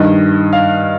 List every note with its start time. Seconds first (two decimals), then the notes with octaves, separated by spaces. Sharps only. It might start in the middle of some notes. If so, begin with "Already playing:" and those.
Already playing: G2 D#3 D#5
0.53 F5